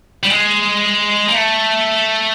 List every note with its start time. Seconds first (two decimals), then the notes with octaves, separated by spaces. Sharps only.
0.23 G3
0.30 G#3
1.29 A#3
1.35 A3